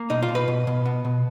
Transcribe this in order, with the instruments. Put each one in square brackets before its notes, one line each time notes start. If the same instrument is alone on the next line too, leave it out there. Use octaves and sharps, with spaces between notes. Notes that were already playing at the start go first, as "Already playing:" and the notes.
Already playing: [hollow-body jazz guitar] A#3
B2 D#4
F4
B2
B4
B2
B2
B3
B2